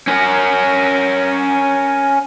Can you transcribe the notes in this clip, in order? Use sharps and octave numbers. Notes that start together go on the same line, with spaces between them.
C#4 A#4